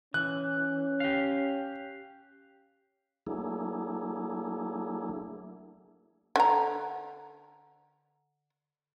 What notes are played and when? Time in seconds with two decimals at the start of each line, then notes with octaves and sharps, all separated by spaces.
0.14 E3 C#4 F#6
1.00 G4 F5
3.27 F#3 A3 A#3 D4 E4 G#4
6.36 D3 A#5